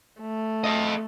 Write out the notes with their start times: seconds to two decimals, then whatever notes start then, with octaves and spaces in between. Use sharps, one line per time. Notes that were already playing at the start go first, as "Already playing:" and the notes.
0.21 A3
0.64 A4 D#5